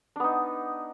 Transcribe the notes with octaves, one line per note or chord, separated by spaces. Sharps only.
B3 D4 D#4